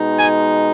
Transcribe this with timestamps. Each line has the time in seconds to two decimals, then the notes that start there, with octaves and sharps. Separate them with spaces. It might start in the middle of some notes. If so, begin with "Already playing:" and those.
Already playing: B2 G#3 D#4
0.16 G#5